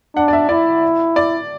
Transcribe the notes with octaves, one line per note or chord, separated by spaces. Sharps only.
D4 F#5
D5
E5
E4 D5
D5